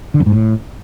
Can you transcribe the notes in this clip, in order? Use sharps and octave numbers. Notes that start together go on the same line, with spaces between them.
D3
F2
G#2
A2